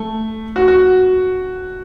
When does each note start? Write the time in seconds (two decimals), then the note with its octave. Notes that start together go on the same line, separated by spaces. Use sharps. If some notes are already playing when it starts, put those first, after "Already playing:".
Already playing: A3
0.56 F#4
0.68 F#4